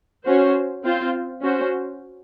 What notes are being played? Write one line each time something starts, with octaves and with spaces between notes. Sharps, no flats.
C#4 F#4 C5
C4 F4 C5
C#4 F#4 C5